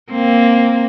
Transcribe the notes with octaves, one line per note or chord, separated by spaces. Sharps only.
A#3 C4